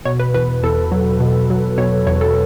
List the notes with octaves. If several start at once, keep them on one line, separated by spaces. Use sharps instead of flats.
B2 C#5
B4
E2 B4
E2 A4
F#3
B2
F#3
B2 C#5
E2 C#5
A4